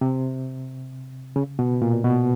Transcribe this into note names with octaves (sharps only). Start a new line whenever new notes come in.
C3
C#3
B2
A#2
B2